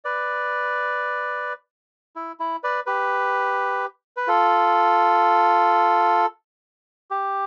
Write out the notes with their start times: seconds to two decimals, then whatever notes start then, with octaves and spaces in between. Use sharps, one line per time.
0.05 B4 D5
2.16 E4
2.40 E4
2.64 B4 D5
2.86 G4 B4
4.17 B4
4.27 F4 A4
7.11 G4